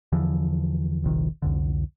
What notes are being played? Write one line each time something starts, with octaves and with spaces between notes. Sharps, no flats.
E2 D3 E3 F3
D#1 A#1 C3 D#3
C2 F2 D3